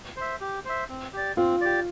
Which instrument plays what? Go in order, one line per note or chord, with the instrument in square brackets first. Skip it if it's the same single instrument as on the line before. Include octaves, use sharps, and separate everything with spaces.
[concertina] C5 E5
G4
C5 E5
C4
G4 D5
[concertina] C4 [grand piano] F4
[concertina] G4 D5